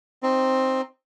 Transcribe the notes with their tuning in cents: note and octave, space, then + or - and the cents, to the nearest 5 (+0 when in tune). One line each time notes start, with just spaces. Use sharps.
C4 +5 D#4 +0